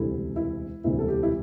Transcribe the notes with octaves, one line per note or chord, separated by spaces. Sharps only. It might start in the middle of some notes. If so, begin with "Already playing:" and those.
Already playing: E1 D2 C3 G3 E4 A4
E4
E1 D2 C3 G3 E4
A4
G4
E4